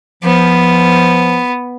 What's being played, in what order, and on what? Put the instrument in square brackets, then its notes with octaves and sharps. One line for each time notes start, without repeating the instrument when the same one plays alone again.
[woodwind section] F3 [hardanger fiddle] B3